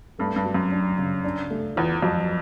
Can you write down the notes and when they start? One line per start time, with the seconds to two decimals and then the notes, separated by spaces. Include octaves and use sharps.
0.19 G2 A3
0.36 G2
0.45 F#3
0.54 F#2
0.72 D4
0.98 C#3
1.24 D4
1.50 A3
1.76 E2 F4
2.02 F2 F#3